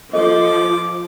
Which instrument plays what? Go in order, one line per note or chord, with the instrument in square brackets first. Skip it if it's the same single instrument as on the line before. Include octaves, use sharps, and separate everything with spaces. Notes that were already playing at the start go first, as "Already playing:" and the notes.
[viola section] F3 [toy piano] A4 D#5 [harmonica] D6